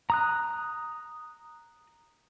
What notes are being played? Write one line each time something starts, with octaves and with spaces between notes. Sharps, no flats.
A#5 D#6 F#6